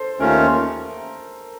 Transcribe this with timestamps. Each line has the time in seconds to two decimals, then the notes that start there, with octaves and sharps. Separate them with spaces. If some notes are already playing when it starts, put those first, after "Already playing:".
Already playing: A4 C5
0.20 D#2 D#3 A3 C#4 F4 A#4